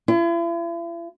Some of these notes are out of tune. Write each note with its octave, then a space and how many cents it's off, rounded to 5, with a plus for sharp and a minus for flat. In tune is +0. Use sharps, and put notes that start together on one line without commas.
E4 +45